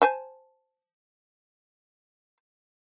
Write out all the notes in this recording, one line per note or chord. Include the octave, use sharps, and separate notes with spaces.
C5 G#5 A5